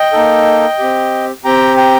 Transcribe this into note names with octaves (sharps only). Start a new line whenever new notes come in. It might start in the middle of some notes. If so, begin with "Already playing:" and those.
Already playing: D#5 G5
A#3 D#4 A4
C4 G4
C4 G4 G5 A#5
G5 A#5